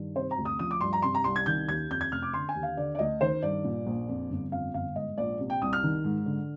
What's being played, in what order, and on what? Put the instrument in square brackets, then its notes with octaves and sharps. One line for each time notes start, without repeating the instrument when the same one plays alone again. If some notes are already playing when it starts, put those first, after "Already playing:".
Already playing: [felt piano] G2 D#3
C3 C5
A#5
D2
D#6
F3 D#6
D6
G2 C6
A#5
C3 C6
A#5
C2 C6
G#6
D#3 G6
D#2 G#6
F2 G6
G#6
F1 F6
D6
D3 C6
G#5
D#2
F5
D3 D5
D5
D2 D#5
D#3 C5
G2 D5
A#2
A#1
F2
G1
F2 F5
G1 F5
G#2 D#5
A#1 D5
C3
G5
C2 D#6
F6
D#3
G#2
D3